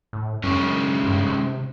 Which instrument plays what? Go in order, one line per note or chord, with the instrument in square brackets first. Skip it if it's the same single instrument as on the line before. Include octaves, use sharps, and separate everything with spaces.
[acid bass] A2
[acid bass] F#2 [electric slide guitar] D#3 G#3 C#4
[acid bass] G2
C3